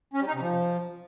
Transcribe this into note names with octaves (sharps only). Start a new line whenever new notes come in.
C#4
G3
D#4
C3
F3